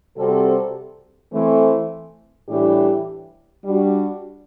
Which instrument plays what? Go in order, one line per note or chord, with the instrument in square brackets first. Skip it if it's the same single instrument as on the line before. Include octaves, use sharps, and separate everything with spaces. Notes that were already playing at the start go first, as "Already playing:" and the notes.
[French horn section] C3 G3 C4 F#4 A4
E3 A3 C4
A2 E3 G3 D4 G4
G3 D4 F#4